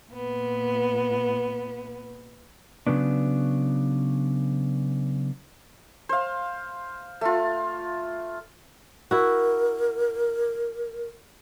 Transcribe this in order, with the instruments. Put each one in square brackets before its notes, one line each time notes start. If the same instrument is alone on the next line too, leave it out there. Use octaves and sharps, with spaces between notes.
[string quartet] A#2 B3
[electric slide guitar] C#3 F#3 B3 D4
[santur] C5 F5
A3 F4
[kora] E4 F#4 [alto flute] A#4